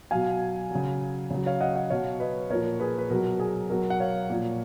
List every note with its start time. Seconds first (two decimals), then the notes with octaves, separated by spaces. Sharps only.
0.11 B2 F#3 F5 G#5
0.71 C#3 F#3
1.30 C#3 F#3
1.46 C#5 F5
1.60 D#5 F#5
1.75 D#5 F#5
1.90 B2 F#3 C#5 F5
2.20 B4 D#5
2.50 A#2 F3 A#4 C#5
2.80 G#4 B4
2.98 B4
3.10 B2 F#3 A#4
3.40 G#4
3.69 B2 F#3 A#4
3.90 F#5
4.00 C#5 F5
4.30 A#2 F3